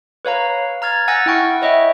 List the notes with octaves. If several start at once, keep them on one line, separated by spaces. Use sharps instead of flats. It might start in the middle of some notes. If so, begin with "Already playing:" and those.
B4 C#5 F5 A#5
A#5 F6 G#6 A6
F#5 G#5 E6 F#6 A6 A#6
E4 F#5 G5 C#6
C#5 D#5 E5 G5